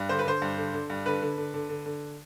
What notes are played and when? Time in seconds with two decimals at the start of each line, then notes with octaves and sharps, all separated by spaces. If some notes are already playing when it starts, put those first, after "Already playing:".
Already playing: G2
0.09 D3 C5
0.19 B4
0.25 D3 C5
0.42 G2
0.57 D3
0.73 D3
0.90 G2
1.06 D3 B4
1.22 D3
1.38 D3
1.54 D3
1.69 D3
1.86 D3